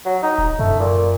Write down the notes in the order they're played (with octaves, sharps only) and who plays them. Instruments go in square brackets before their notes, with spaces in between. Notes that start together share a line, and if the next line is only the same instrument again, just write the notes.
[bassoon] F#3
D#4
[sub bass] D1
[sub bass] F#2 [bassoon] A3
[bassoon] A#2